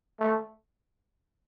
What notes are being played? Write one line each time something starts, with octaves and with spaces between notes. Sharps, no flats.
A3